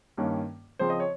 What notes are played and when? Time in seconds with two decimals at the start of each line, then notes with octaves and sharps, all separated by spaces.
0.18 G2 D#3 A#3 C#4
0.79 C#3 F3 C4 C5
0.90 D#5
1.00 C#5